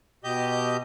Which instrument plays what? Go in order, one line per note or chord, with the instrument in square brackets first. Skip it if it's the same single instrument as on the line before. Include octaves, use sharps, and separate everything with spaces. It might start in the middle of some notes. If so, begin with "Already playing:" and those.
[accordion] B2 G4 D#5 G6